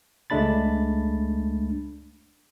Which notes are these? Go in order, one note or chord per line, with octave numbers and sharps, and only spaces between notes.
C#2 G#3 A3 D4 B5 A6